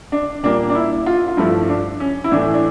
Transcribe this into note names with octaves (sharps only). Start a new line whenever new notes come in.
D4
A#2 G3 A#3 D4
D4
E4
F4
F4
G2 F3 A3 E4
D4
C#4
E4
A2 E3 A3 D4
D4